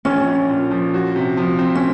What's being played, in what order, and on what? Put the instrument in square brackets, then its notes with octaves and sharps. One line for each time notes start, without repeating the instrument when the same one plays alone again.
[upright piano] A#1 [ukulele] C#4
[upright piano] A#1
A#2
F3
F#4
C3
F3
C4
[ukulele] C#4